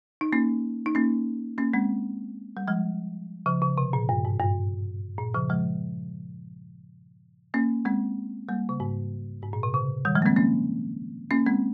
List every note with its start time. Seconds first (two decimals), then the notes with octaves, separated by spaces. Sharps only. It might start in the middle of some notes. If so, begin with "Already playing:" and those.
0.21 D#4
0.33 A#3 C#4
0.86 D#4
0.95 A#3 C#4
1.58 A#3 C#4
1.73 G#3 C4
2.57 G3
2.68 F3 G#3
3.46 C#3 F3
3.62 C#3
3.78 C3
3.93 A#2
4.09 G2
4.25 G#2
4.40 G2
5.18 A#2
5.34 C#3 F3
5.50 F3 G#3
7.54 A#3 C#4
7.85 G#3 C4
8.49 G3 A#3
8.69 C#3
8.80 G#2
9.42 G#2
9.53 A#2
9.63 C3
9.74 C#3
10.05 D#3 G3
10.15 F3 G#3
10.22 A#3
10.26 G#3 C4
10.36 A#3 C#4
11.31 A#3 C#4
11.46 G#3 C4